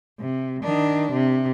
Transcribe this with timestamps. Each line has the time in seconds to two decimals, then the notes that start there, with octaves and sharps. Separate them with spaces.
0.20 C3
0.62 D#3 D4
1.12 C3